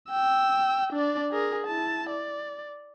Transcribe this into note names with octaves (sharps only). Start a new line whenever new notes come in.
G5 E6
D4 D5
G#4 A#4
E4 A5
D5